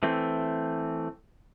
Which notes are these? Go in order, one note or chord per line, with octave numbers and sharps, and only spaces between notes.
E3 A3 C4